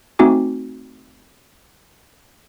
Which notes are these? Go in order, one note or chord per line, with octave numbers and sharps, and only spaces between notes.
A3 C4 D#4 F#4 G#5 D6